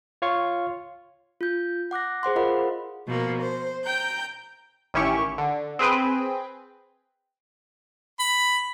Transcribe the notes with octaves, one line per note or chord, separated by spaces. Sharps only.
F4 C#5 F5 C#6
F4 G6
F#5 D6 F#6 A#6
G#4 C5 F#5 C6
F4 A#4 D#5 F5 F#5 B5
B2 F3 A#3
C5
G5 A#5 G6
A1 D#3 C#4 E4 G4 C#6
D3
C4 G#4 B4 G5
B5